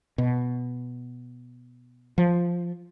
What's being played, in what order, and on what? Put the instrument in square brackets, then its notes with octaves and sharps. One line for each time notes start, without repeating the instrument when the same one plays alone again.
[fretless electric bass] B2
F3